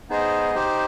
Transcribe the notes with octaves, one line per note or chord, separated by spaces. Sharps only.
B3 D#4 G#4 C5 D#5
D#4 G4 C5